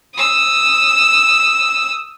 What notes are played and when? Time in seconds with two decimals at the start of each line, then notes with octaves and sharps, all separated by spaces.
0.16 D#6 E6